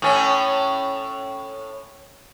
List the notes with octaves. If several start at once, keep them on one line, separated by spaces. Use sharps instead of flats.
A2 C#4